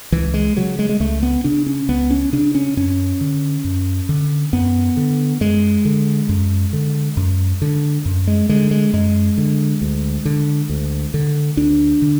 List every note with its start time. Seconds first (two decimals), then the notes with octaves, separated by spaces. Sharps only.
0.12 C#2 E3
0.34 G#3
0.56 C#3 F#3
0.79 G#3
0.89 G#3
1.00 C#2 A3
1.23 B3
1.44 C#3 D4
1.66 C#4
1.89 C#2 B3
2.11 C#4
2.33 C#3 D4
2.55 C#4
2.77 F#2 C#4
3.21 D3
3.64 F#2
4.09 D3
4.53 F#2 B3
4.97 D3
5.41 F#2 G#3
5.85 D3
6.29 F#2
6.73 D3
7.17 F#2
7.62 D3
8.05 F#2
8.27 G#3
8.49 D3 G#3
8.71 G#3
8.93 F#2 G#3
9.38 D3
9.82 D2
10.25 D3
10.70 D2
11.14 D3
11.57 D2 D4
12.02 D3